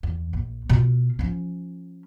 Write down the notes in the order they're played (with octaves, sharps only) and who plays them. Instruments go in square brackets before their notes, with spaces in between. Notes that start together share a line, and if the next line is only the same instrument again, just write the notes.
[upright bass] E2
A#1
B2 F4
F3 C#4